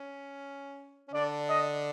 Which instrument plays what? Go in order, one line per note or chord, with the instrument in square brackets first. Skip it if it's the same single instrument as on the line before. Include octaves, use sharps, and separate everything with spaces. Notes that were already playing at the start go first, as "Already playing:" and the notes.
Already playing: [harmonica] C#4
C#4
[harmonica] D3 D4 [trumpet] D5
[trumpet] D#5